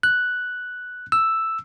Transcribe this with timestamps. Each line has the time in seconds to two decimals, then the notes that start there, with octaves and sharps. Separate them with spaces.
0.03 F#6
1.12 E6